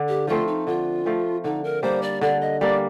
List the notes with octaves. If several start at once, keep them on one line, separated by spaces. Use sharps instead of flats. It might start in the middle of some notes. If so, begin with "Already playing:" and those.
Already playing: D3
G4
F3 A3 C4 F4
D#4
D3 F4
F3 A3 C4
D3 D#4
A#4
G3 A#3 D4 C5
D5
D3 D5
D#5
G3 A#3 D4 D5